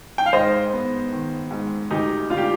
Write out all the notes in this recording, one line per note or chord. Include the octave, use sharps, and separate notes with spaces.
G5
F5
G#2 C5 D#5
B3
D#3
G#2
D2 D#4 G4
D3 F4
G4